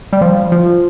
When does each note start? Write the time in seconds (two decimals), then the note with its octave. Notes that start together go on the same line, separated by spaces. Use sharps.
0.13 G3
0.21 F3
0.52 F3